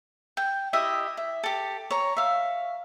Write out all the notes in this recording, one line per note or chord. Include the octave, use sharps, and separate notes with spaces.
G5
E4 G4 D#5 E5
E5
G4 A4
C#5 A#5
E5 F5